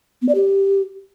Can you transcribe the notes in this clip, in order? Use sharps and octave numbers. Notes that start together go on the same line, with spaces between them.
B3
D5
G4